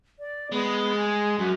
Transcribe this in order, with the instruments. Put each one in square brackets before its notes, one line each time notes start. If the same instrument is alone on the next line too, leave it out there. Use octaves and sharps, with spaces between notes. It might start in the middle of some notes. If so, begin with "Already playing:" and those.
[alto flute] D5
[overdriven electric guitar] G#3 [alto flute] B3
[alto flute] G#5
[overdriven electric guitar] F#2 [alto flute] F#4